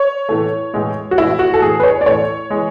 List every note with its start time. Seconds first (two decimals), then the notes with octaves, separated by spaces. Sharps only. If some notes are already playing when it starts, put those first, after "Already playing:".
Already playing: C#5
0.29 A2 E3 A3
0.74 A2 E3 G#3
1.11 F#4
1.18 A2 E3 G#3 E4
1.39 F#4
1.54 A4
1.61 A2 E3 A3 G#4
1.80 B4
1.83 C#5
2.01 D5
2.06 A2 E3 A3 C#5
2.50 E3 G#3